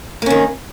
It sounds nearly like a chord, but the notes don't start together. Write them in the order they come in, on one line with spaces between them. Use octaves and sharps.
A#3 C#4 D#3